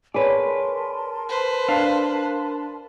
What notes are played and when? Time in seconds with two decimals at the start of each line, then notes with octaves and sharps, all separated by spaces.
0.14 G#4 A#4 B4 C#5 D5 A5 C6
1.29 B4 C5
1.68 D4 F5